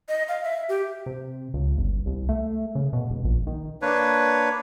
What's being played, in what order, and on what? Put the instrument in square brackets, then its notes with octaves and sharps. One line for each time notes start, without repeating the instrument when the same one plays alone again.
[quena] D#5
F5
E5
G4
[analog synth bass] C3
C#2
G1
C2
A3
C#3
B2
E1
A#1
D#3
[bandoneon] A#3 D4 B4 C#5